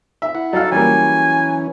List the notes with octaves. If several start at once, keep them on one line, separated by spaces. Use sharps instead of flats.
E5
E4 F#5
F#3 D#4 A4 F5
E3 G3 A#3 C#4 G#5